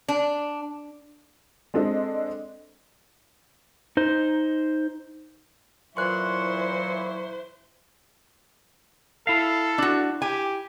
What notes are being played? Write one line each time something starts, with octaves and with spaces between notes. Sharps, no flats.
D4
G#3 C4 D4 A4 D#5
D#4 C5
A#2 E3 F#3 E4 C5 C6 C#6 F#6
E4 A4 F5
D4 F#4
G4 G#5